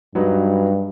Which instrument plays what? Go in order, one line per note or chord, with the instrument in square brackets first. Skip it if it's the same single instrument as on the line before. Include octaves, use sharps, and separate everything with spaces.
[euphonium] G2 [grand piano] F#3 D#4 B4